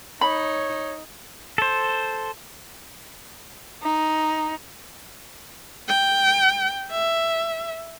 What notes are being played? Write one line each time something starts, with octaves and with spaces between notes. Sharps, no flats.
D#4 C#5 B5
A4 C5
D#4
G5
E5